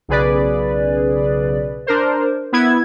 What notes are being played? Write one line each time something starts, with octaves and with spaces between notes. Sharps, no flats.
B1 C#3 G#4 B4 D5
D4 A#4 C5
B3 E4 G#6